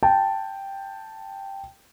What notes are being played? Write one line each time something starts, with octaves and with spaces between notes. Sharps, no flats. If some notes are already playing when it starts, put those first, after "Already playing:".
G5 A5